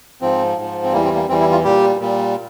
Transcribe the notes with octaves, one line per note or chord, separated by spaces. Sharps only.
G#2 F3 C4
G#2 F3
C4
E2 E3 G3 A#3
C4
A#3
E2 E3 G3 C4
E4
F4
A#2 G3 G4
A#2 G3